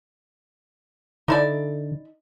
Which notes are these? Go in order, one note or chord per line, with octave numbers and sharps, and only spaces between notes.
D3 D#4 E4 D5